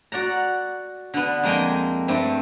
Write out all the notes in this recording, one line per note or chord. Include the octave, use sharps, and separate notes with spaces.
F#4 D5 F#5 A#5
D3 B3
F2 G#3 A#3 G5 G#5
G2 A3 C4